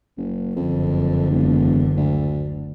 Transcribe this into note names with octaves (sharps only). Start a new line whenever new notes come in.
F#1
F#1 F2 D3
E1
D2